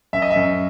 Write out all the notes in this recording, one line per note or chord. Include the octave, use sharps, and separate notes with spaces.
F#2 E5
D#5
E5
F#2